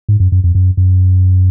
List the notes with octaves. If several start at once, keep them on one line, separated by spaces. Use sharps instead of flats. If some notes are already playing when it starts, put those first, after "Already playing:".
G#2
F#2
F#2
F2
F#2
F#2